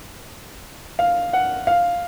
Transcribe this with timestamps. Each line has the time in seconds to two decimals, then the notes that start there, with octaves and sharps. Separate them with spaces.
0.99 F5
1.33 F#5
1.67 F5